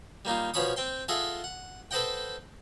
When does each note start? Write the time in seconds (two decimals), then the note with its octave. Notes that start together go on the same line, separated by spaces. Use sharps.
0.25 G3 A#3 D#4 F4
0.54 B2 F3 C#4 B5 C#6 D#6
0.76 C4 G5 C6
1.08 F4 G#4 A4 D#5 E5 F#5
1.44 F#5
1.91 A4 B4 C5 D#5 F#5 G5